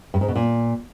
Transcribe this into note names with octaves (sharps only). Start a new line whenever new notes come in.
G2
G#2
B2
A#2